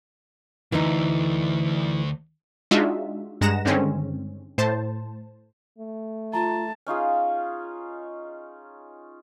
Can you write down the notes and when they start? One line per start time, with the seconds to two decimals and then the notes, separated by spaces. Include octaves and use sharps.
0.72 D2 E3 D#4
2.71 G#3 D4 D#4 F4 F#4 E5
3.41 G2 G#3 F#5 A#5 A#6 E7
3.65 G2 D3 D#3 G#3 C4 C#4
4.58 A2 C5 A5
5.78 A3
6.34 F4 A5 A#5
6.86 C#4 D#4 F4 G#4